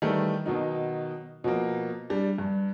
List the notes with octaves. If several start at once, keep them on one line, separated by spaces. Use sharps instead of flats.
D#3 E3 G3 A3
B2 D#3 F#3 D#4
B2 F3 A#3
G3 D4
G2